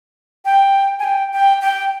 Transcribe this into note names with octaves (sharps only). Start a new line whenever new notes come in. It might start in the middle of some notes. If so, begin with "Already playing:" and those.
G5
G#5
G5
G5
G5